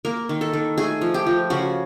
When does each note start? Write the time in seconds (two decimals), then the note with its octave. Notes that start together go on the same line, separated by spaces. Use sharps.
0.05 A#3 A#4
0.29 D#3
0.41 A4
0.53 D#3
0.78 A3 G#4
1.01 F3
1.14 G4
1.27 F3
1.50 C#3 F#4